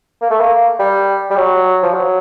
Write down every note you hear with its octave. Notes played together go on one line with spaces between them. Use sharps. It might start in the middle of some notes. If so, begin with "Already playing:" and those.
A#3
A3
A#3
G3
G3
F#3
F3
F#3